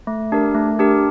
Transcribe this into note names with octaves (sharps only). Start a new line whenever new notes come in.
A3
D4 G4 A#4
A3
D4 G4 A#4